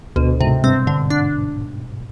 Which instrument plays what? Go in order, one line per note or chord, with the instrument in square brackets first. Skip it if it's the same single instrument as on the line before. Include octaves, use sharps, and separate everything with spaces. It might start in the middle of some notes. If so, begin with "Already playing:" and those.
[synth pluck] D2 [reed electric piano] B2
[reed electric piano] G#2 [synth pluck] C3
[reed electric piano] G2 [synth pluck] C4
[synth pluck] D3
D4